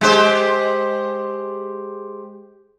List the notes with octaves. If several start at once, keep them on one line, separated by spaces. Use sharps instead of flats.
G#3 G4 C5